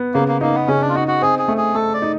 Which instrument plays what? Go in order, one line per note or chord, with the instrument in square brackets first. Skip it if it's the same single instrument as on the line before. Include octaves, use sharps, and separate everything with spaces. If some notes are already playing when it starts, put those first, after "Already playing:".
Already playing: [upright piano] B3
[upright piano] C#3 [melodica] A#3
[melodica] A#3
[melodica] A#3 [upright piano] D#4
[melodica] B3
[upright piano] C#3 [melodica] C#4
[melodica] D4
F4
[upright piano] D#4 [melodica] F#4
[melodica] F#4
[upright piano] C4 [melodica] G#4
[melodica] G#4
[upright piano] A3
[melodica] G#4
[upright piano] A3 [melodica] A4
[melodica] D5
[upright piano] D#4